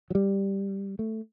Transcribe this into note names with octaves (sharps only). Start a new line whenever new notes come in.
F#3
G3
A3